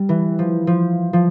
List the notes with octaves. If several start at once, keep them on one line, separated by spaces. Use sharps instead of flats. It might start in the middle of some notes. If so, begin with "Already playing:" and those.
Already playing: G3
E3
F3
F3
F3